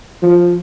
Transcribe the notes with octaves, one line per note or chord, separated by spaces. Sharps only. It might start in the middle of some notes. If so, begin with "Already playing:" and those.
F3